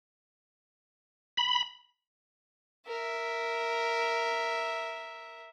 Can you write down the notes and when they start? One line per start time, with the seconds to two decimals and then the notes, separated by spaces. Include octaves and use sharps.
1.37 B5
2.87 A#4 E5